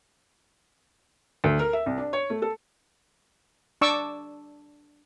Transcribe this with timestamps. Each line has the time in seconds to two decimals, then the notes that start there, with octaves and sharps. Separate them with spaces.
1.44 D2
1.59 A#4
1.73 E5
1.86 C2
1.98 D4
2.13 C#5
2.30 A3
2.42 A4
3.81 D4 D5 C#6 D6 E6